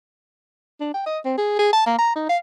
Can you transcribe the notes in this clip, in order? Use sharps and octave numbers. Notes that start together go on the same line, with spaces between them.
D4
G5
D#5
C4
G#4
G#4
A5
A#3
A#5
D#4
F5